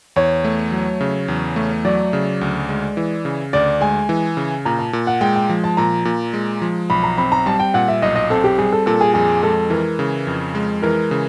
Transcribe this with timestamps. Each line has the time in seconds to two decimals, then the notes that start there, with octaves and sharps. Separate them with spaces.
0.16 E2 C#5
0.45 A3
0.72 F#3
1.01 C#3
1.28 E2
1.56 A3
1.85 F#3 D5
2.13 C#3
2.41 D2
2.69 G#3
2.97 E3
3.25 C#3
3.53 D2 D5
3.81 G#3 G#5
4.09 E3
4.37 C#3
4.65 A#2 A#5
4.79 A5
4.93 A#2
5.07 F#5
5.21 G#3 G5
5.36 G5
5.49 F3
5.64 A5
5.77 A#2 A#5
6.05 A#2
6.33 G#3
6.62 F3
6.90 B1 B5
7.03 A#5
7.18 C4 B5
7.32 A#5
7.46 G3 A5
7.59 G5
7.74 A#2 F#5
7.88 E5
8.02 B1 D#5
8.16 D#5
8.30 C4 A4
8.44 G4
8.58 G3 G#4
8.72 A4
8.86 A#2 A4
9.01 G#4
9.14 F2 G#4
9.43 G#3 A4
9.70 E3 A#4
9.99 C#3
10.27 F2
10.55 G#3
10.82 E3 A#4
11.11 C#3